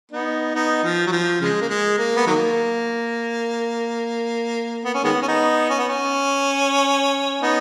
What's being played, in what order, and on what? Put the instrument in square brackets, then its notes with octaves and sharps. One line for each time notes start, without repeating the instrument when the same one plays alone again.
[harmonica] B3 D#4
B3 D#4
F3
F#3
F3
C#3 F3 G#3
A#3
G#3
A#3
B3
D#3 F#3 A#3
B3
C#4
D#3 G#3 B3
C#4
B3 D#4
C#4
B3
C#4
B3 D#4